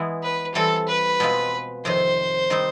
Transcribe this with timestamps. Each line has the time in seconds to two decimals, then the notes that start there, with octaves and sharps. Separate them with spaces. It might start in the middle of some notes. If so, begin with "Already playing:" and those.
Already playing: E3 G#3 B3 E4
0.23 B4
0.54 E3 G3 C4 A4
0.88 B4
1.20 B2 G#3 C4 F4
1.85 F2 C3 D#3 C5
2.50 D#3 G3 C4 D#4